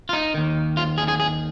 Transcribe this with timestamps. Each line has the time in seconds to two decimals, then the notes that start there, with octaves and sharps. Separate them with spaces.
0.09 F4
0.13 D#4
0.34 D#2 D#3
0.77 F4
0.98 G#4
1.08 G#4
1.20 G#4